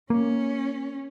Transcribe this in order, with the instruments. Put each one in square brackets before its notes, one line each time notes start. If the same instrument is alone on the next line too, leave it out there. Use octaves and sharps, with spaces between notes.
[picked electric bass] A#3 [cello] C#4